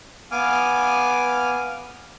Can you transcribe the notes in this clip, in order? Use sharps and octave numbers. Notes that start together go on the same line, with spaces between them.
B3 F5 G#5 D6 F6